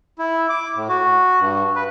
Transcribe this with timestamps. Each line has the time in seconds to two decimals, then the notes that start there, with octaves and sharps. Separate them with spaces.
0.19 E4
0.49 D6
0.76 A2
0.89 F#4
1.40 G2
1.75 B4